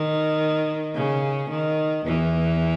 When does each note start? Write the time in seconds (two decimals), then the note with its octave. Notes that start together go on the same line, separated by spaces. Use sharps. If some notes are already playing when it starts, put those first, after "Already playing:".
Already playing: D#3
0.95 C#3
1.51 D#3
2.06 E2 E3